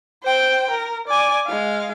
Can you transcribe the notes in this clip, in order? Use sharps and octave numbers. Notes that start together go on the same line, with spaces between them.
C5 G5
A#4
D5 G#5
G#3 F5